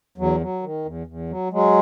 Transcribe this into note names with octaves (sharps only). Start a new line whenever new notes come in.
E2 F#3
F#3
D#3
E2
E2
F#3
F#3 G#3